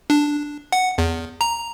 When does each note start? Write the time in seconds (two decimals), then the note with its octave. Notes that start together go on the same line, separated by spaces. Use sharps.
0.10 D4
0.72 F#5
0.98 E2
1.41 A#5